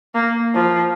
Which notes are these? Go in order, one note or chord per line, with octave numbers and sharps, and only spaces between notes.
A#3
F3